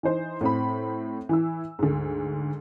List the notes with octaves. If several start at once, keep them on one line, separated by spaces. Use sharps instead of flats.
E3 D#4 C5
A2 C4 B5
E3 E4 E6
D2 G#2